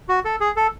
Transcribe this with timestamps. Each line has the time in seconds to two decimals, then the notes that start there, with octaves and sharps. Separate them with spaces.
0.09 F#4
0.25 A4
0.40 G#4
0.56 A4